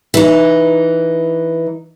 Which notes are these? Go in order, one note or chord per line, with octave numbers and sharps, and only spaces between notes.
E3 D#4